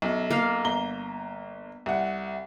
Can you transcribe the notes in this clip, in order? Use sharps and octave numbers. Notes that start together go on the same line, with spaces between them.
B1 F#2
A#3 F5
G1 A#5 G7
C2 F#5